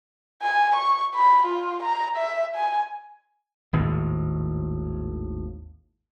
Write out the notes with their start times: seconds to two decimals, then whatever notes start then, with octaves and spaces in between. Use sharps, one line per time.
0.42 G#5
0.76 C#6
1.16 B5
1.46 F4
1.83 A#5
2.17 E5
2.55 G#5
3.73 G#1 D#2 A2